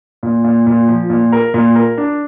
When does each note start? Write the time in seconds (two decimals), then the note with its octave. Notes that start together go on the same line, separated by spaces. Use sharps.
0.23 A#2
0.44 A#2
0.67 A#2
0.88 F3
1.10 A#2
1.32 A#4
1.54 A#2
1.75 A#4
1.97 D4